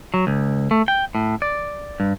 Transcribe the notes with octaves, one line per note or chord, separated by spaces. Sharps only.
F#3
C#2
A3
G5
A2
D5
G2